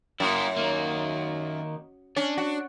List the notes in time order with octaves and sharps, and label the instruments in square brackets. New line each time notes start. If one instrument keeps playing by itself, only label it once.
[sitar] F#2 [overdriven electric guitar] A#3 E4
[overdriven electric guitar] D#3 A#3
[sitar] C#4 [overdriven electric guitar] D4
[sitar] F#4